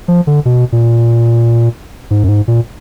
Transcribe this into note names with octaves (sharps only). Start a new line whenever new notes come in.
F3
D3
B2
A#2
G#2
F#2
G#2
A#2